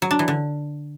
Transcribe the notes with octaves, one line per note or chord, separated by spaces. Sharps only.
F#3
D4
E3
D3